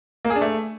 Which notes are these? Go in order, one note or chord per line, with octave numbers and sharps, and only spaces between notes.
A#3
G#4
D4
A3